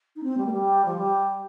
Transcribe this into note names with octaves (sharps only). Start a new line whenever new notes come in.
D#4
C4
G3
A#3
G3
F3
G3